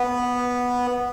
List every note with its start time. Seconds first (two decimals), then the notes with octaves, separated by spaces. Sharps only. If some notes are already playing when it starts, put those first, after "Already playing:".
Already playing: B3